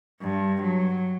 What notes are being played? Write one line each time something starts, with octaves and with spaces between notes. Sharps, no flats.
G2
F#3